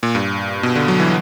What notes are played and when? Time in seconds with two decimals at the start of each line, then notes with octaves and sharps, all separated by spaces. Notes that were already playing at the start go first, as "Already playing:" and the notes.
0.03 A#2
0.15 G2
0.63 B2
0.76 D3
0.88 F#3
1.00 E3